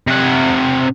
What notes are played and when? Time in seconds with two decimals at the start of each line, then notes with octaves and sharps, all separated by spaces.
0.07 C3 F#5